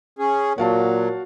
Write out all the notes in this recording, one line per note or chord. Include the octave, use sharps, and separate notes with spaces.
C#4 G#4
A#2 F#3 F#4 F5 A5